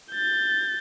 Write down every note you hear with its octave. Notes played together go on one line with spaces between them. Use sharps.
G6 A6